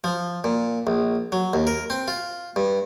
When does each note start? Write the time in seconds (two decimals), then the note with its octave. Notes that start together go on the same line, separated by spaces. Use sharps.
0.04 F3
0.44 A#2
0.87 A#1
1.32 F#3
1.53 D#2
1.67 A#4
1.90 C4
2.08 F4
2.56 G2